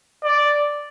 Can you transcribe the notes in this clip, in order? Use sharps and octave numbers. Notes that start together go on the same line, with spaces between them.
D5